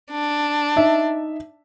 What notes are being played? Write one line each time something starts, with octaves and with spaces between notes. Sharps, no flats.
D4
D#4 E5